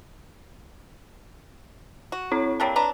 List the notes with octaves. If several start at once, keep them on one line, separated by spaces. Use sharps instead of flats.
F#4
C4 E4 C#5
D3 G3 A#3 C#5 G5 A5
D4 B4 A#5